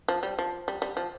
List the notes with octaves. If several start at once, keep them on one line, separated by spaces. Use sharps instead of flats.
F3
G3
F3
G3
G3
F3